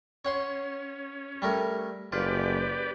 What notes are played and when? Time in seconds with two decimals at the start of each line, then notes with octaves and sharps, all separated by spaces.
0.25 C#4 C#5 F#5 C6
1.42 G3 A3 A#4
2.12 F#1 F4 G4 B4 D5